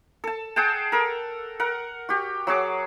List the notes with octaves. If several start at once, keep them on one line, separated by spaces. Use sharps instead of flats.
A4 A5
G#4 F#5 G5 A5
A4 A#4
A#4 F#5
F#4 G4
F#3 F#4 G#4 D6